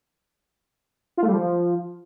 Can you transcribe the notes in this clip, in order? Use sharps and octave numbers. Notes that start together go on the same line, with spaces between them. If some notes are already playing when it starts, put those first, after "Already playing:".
F4
A3
G3
F3